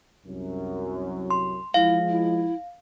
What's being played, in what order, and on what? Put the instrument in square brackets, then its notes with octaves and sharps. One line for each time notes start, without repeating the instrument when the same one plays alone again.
[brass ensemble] C2 F#2
[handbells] C6
[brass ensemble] F3 G#3 [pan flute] E4 [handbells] F5
[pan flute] E4